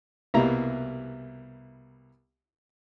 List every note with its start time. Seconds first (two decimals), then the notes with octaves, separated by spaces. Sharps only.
0.34 C2 B2 G3 A#3 E4 A#5